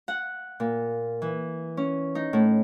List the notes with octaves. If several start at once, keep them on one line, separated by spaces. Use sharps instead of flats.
F#5
A#2
E3
C#4
D#4
A2